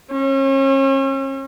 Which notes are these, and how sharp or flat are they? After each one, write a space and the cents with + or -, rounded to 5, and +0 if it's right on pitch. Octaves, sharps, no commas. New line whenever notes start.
C#4 -40